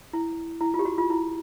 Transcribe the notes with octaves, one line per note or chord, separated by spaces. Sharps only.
E4
E4
F4
G4
F#4
F4
E4